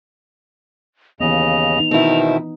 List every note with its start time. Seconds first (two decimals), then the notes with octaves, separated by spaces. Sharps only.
1.21 D#2 C#3 E3 B3 D#5 F7
1.80 D#4
1.91 B2 D#3 C4 E4